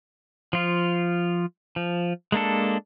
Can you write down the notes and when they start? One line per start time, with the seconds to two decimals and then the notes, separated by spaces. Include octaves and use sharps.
0.53 F3 F4
1.76 F3
2.32 G#3 A#3 D4 A4